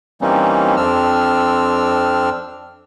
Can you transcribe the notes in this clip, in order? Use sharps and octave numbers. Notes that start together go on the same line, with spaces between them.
E3 G3 A#3 C4 C#4 D#4
F2 C4 D4 E6 F6